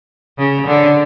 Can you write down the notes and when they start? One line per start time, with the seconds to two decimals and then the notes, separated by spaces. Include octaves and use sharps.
0.38 C#3
0.67 D3